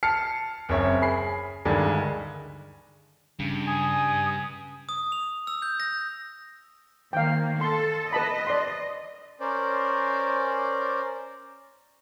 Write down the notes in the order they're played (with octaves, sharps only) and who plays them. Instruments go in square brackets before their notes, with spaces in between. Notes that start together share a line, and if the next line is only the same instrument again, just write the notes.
[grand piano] A5 F6 C7 C#7
F#1 F#2 C4 C#5 E5 C#6
G#4 B5 C7
D2 G2 D3 D#3 G#3
[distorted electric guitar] G2 [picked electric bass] C#3
[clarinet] G#5 [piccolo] D#6
[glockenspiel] D#6
F7
E6
G6
A#6
[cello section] D#3 A#3 [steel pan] F5 G5
[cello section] A4 [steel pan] C6
[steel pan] B4 A5 B5 [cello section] D#5
[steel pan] D5 C6
[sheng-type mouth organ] C#4 A#4 C5 D5